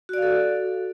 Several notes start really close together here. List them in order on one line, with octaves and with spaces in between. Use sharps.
F#4 D5 F5 A4